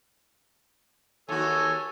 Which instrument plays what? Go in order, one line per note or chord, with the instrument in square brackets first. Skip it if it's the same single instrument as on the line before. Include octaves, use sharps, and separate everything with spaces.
[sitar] D#2 F#4 [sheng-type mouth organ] A4 C#5 G#5